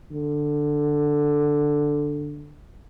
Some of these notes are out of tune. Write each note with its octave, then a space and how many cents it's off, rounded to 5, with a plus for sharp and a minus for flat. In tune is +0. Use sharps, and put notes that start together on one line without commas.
D3 +5